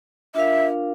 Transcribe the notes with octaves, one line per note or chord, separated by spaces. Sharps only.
D4 F4 A#4 E5 F5